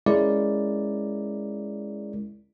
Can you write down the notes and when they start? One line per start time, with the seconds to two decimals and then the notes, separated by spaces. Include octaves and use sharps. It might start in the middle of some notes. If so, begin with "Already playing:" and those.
0.06 G#3 C#4 E4 A#4 D5